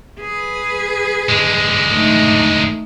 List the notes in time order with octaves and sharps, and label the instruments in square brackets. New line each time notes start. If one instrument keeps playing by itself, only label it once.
[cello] G#4 B4
[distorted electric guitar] D3 G#3
[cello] A3 D#4